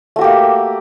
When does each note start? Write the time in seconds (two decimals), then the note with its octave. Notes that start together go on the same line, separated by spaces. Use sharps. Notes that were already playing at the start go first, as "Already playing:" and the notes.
0.16 A3
0.19 F#4
0.21 G4
0.24 A#3